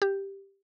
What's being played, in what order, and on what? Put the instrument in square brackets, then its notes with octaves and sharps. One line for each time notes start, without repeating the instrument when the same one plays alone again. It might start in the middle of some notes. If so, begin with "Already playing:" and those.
[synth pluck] G4